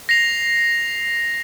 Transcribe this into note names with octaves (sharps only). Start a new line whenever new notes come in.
A#6 C7 F7